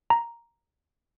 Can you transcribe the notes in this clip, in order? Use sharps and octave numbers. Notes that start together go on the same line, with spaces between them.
A#5